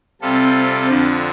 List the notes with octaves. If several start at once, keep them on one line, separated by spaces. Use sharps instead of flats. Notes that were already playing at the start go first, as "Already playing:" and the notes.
C3 G3 C4 F4 A4
F2 D3 F3 D4